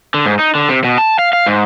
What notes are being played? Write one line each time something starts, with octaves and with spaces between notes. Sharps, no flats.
D3
G#2
D#4
D3
C3
B2
A5
F5
F5
G#2